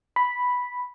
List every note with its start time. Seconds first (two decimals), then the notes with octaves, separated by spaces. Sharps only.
0.16 B5